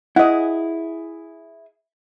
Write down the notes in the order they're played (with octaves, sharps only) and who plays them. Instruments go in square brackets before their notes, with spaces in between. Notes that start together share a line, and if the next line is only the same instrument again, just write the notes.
[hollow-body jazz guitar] E4 G#4 [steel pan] D#5 F#5